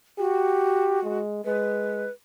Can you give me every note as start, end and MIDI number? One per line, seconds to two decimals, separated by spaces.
0.19 1.19 66
0.19 1.02 67
1.03 1.43 56
1.45 2.06 56
1.45 2.11 71